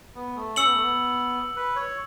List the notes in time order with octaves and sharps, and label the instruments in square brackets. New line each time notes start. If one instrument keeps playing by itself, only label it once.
[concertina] B3
A3
[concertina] C#4 [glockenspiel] E6 C#7 F#7
[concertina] B3
A3
B3
B4
C#5